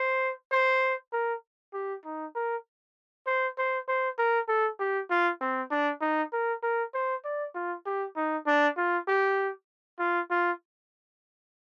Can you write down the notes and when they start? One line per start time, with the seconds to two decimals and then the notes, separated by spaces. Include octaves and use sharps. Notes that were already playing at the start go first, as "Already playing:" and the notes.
Already playing: C5
0.52 C5
1.13 A#4
1.73 G4
2.05 D#4
2.35 A#4
3.27 C5
3.58 C5
3.88 C5
4.19 A#4
4.49 A4
4.80 G4
5.11 F4
5.41 C4
5.71 D4
6.01 D#4
6.33 A#4
6.63 A#4
6.94 C5
7.25 D5
7.55 F4
7.85 G4
8.16 D#4
8.47 D4
8.77 F4
9.08 G4
9.99 F4
10.30 F4